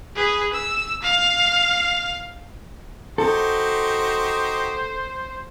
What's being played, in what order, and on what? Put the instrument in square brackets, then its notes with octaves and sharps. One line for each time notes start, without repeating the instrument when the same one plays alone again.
[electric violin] G#4 B4
E6
F5
[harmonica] D#4 F#4 G4 [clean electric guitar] A4 [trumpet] C5